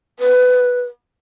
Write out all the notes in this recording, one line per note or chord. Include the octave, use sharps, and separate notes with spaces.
B4